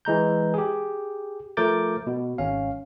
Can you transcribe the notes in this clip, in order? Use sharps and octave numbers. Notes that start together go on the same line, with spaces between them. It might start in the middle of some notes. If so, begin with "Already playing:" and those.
E3 G#3 A#5 G6
G4 G#4
F3 A3 A#4 D6 G6 A6
B2
G#1 C#4 F5